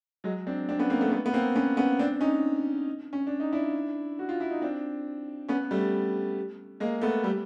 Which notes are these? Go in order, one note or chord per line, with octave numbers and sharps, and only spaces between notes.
F#3 G#3
C4 D4
C4 D4
B3 C#4
A#3 C4
A3 B3
A3 B3
B3
A#3 C4
B3 C#4
B3 C#4
C4 D4
C#4 D#4
C#4
D4
D#4
D4 E4
F#4
F4
E4
D#4
C4 D4
B3 C#4
G3 A3
G#3 A#3
A3 B3
G3 A3